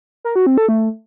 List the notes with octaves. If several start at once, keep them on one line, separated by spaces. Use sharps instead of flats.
A#4
F#4
C4
A4
A3